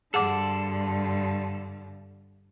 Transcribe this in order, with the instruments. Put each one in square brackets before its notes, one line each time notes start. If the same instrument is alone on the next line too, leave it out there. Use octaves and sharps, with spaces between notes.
[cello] G2 D3 [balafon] G#4 F#5 D6 [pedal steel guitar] A4 C5 D5